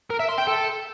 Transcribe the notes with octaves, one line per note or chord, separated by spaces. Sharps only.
A#4
E5
C6
G5
A4